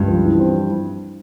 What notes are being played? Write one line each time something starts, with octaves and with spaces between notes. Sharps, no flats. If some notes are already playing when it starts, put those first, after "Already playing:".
Already playing: C#2 G2
F3
E3
C4